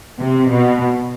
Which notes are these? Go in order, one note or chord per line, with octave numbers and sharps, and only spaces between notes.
C3
B2